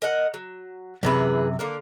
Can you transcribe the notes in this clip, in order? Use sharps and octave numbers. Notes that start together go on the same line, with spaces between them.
A#4 D#5 F#5
F#3
F#2 C3 E3 G#4 B4 B5
D3 A#3 A#4